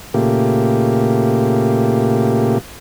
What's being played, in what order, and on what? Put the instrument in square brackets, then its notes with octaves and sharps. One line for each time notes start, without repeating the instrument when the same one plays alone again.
[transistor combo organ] A#2 C#3 A3 A#3 G4